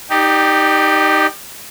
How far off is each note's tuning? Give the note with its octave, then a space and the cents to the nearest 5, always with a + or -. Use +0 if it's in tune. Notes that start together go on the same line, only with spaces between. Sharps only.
D#4 +0 G4 +0 D5 +35